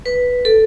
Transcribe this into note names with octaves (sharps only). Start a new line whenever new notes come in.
B4
A4